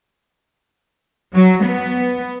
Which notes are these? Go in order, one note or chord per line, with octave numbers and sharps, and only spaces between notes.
F#3
B3